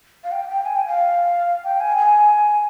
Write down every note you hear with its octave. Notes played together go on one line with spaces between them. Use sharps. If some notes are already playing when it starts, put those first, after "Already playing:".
F5
G5
G5
G#5
G5
F5
G5
G#5
G#5